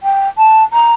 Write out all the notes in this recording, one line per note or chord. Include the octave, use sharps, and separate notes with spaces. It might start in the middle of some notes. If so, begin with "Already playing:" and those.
G5
A5
A#5